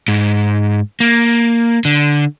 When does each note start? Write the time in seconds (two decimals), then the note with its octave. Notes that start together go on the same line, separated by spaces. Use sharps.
0.08 G#2
1.00 A#3
1.85 D3